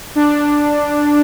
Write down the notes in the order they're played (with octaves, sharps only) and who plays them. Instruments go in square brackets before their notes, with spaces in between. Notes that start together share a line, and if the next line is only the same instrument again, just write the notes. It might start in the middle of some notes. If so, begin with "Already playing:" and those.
[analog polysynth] D4